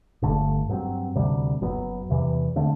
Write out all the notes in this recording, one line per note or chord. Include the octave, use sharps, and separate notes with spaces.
G1 G2 D3 A3
G2 F#3 C4
D2 C3 G3
F#1 F#2 F#3 B3
E2 C3 E3
D3 A3 C4